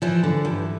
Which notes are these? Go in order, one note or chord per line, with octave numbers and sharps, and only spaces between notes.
E3 F3 E4
D3
G2